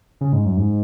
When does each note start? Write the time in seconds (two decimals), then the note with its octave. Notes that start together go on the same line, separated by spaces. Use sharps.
0.21 C#3
0.33 G#2
0.45 F#2
0.57 G#2